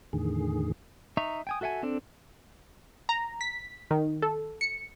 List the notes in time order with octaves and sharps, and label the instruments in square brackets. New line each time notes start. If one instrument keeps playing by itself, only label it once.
[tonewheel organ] E2 A2 D3 D#3 G#4
[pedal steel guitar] D#4 E5 A#5 C#6
G5 G#5 D#6
F#4 A4 E5 F#5 G#5
C4 D4 A4
[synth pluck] A#5
B6
D#3
A4
C#7